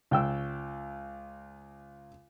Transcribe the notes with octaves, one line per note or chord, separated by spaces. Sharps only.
C#2 G5 E6